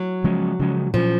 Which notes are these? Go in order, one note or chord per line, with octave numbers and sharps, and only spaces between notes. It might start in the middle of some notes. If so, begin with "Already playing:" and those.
Already playing: F#3
C#3 F3 G#3 C#4
C#3 F3 G#3 C#4
A#2 F3 F#3 C#4